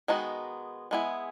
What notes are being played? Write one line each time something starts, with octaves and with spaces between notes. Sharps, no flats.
D#3 G#3 B3 D#4 F#4
G#3 B3 E4 G#4